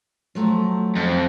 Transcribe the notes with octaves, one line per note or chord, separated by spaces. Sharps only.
F3 F#3 A3
F2